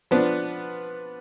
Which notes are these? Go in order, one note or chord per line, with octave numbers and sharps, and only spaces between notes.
F3 B3 D4